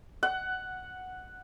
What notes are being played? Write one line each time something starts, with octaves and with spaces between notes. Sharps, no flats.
F#5